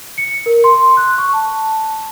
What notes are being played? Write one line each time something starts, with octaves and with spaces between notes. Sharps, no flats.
C#7
A#4
C6
F#6
C#6
A5